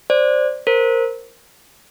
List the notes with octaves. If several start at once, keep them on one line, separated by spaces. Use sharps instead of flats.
C5 D5
A#4 C5